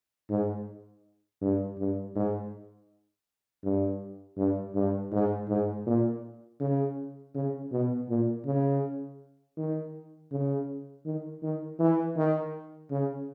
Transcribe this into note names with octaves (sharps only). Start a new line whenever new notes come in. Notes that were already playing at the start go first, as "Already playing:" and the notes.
G#2
G2
G2
G#2
G2
G2
G2
G#2
G#2
A#2
C#3
C#3
B2
A#2
C#3
D#3
C#3
D#3
D#3
E3
D#3
C#3